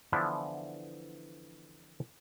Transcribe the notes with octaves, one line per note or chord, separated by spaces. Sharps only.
D3 E3 F3 B3 D4 E4